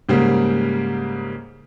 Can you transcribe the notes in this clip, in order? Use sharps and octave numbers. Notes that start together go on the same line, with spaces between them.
G#2 C#3 G3 A#3